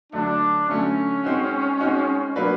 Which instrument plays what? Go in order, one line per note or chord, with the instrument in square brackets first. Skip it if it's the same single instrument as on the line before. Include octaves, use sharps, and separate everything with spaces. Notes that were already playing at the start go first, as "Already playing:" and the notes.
[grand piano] D3 F#3 A3 [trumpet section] D4
[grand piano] D3 F#3 A3 [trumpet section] C#4
[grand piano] G#3 C4 D#4 F#4
G#3 C4 D#4 F#4
F#3 A#3 D4 F#4 B4